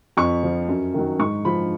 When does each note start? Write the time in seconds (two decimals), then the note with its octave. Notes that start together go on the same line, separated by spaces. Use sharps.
0.17 F2 C#6
0.43 F3
0.68 F#2
0.94 D#3 F#3
1.19 G#2 C#6
1.45 F3 B5